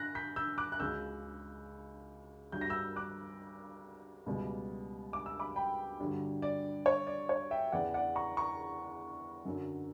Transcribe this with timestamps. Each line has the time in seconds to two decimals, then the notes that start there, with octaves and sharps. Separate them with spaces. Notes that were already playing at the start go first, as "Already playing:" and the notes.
Already playing: D3 F#6 A#6
0.15 G6 B6
0.36 E6 G6
0.58 D6 F#6
0.72 F#6
0.80 C#2 C#3 F#3 E6 G6
2.52 G2 F#3 G6
2.61 A#6
2.70 E6 G6
2.96 D6 F#6
4.26 C#2 B2 G3
5.13 D6
5.26 E6
5.40 B5 D6
5.56 G5 B5
5.99 G2 D3 F#3
6.42 D5
6.86 C#5
7.07 D5
7.29 C#5
7.51 E5 G5
7.72 E2 C#3 E3 D5 F#5
7.94 D5 F#5
8.15 A#5 C#6
8.37 A#5 C#6
9.45 F#2 D3 F#3